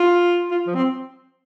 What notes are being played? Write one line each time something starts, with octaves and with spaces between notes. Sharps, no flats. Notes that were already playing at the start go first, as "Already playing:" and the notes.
Already playing: F4
F4
F3
C4